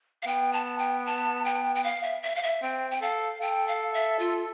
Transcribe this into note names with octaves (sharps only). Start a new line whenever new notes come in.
F5
B3 G5
A5
G5
A5
G5
G5
F5
E5
E5
F5
E5
C4 G5
G5
A4 F5
A4 G5
F5
E5
F4